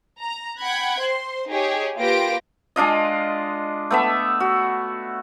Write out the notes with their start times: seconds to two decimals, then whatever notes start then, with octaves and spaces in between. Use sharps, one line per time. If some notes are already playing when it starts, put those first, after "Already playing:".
0.19 A#5
0.59 F#5 G5 B5 F#6 G#6
1.02 C5 C6
1.50 D#4 G4 G#4 C#5
1.98 A#3 F4 G4 B4 A#6 D7
2.76 G#3 D4 F4 D#5
3.91 A3 B3 E5
4.40 F#4